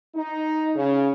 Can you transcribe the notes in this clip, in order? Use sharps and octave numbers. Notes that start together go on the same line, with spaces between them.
D#4
C#3